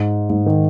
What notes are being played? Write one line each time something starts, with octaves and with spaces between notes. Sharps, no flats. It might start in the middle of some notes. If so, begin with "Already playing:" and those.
Already playing: G#2
G#2
D#3